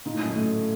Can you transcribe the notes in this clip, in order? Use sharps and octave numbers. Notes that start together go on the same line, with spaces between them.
A#2 D#4
A2
F#2
A2
A3